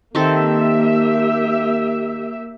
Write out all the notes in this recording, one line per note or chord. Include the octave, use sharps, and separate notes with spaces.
D#3 A#3 C4 G4 A4 E5